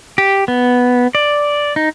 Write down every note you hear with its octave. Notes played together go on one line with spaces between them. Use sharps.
G4
B3
D5
D#4